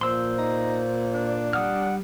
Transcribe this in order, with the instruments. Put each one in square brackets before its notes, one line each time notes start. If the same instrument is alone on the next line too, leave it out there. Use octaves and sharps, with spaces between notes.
[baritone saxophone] A#2 [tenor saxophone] F3 [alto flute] C5 [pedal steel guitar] C6 E6
[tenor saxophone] D#4
D4
[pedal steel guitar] G3 D#6 F6 [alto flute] F#5